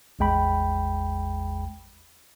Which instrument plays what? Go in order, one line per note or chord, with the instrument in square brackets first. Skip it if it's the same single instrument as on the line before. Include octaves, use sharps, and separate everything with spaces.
[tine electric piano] A1 E2 G#3 G5 B5